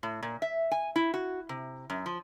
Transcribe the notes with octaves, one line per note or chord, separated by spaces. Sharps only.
A2
A#2
E5
G#5
E4
F#4
C3
F#2
F3